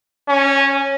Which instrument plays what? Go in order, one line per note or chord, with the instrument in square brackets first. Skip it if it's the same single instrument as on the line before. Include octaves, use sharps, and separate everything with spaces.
[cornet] C#4